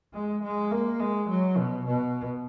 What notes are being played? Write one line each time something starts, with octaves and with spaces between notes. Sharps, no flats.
G#3
G#3
A#3
G#3
F#3
B2
B2